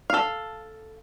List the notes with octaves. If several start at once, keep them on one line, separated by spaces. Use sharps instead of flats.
A4 F5